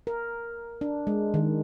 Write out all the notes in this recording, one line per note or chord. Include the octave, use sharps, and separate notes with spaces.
A#4
D4
G#3
D#3